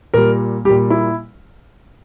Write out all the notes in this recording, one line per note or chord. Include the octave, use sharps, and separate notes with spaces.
A#2 G3 A#4
A#2 G3 G4
E4